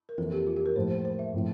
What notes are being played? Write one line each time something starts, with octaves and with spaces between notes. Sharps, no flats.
A#4
F2 E3 A#3 A4
G4
F4
G4
A#4
A2 F3 A#3 F4 C5
C5
C5
E5
A2 F3 C4